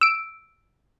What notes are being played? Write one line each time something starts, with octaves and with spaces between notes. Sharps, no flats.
E6 D7